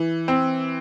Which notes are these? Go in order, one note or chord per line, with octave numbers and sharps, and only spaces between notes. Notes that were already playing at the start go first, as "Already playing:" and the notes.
Already playing: E3
C4